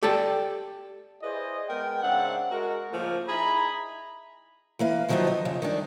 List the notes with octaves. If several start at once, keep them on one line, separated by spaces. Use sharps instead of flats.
G4 A4 D5 G5 A5
E4 G#4 B4 C5 D5 D#5
G#3 B3 A#4 G5
G#2 C#3 C4 D4 E5 F#5
G#3 F#4 A#4
A2 C#3 F3 A3 A#3
D#4 E4 G#4 A#5 B5
E3 A#3 B4 F5
D3 D#3 F3 F#3 B3 D#4
D#5
F2 C#3
D#3 G3 D4